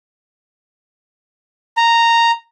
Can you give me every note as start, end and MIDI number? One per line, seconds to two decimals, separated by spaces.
1.77 2.31 82